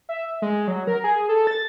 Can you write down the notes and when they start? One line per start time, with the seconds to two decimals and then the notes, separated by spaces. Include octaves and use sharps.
0.09 E5
0.42 G#3
0.68 F#3
0.87 A#4
1.04 G#4
1.29 A4
1.47 A6